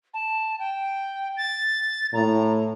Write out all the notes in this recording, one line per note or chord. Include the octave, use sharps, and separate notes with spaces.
A5
G5
A6
A2 A#5